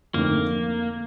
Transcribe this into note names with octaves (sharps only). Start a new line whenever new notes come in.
F2 D3 A3 A#3 C4 D#4